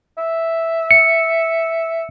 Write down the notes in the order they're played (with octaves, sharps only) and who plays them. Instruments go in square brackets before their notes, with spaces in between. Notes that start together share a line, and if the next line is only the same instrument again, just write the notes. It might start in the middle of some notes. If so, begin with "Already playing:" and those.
[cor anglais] E5
[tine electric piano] C#7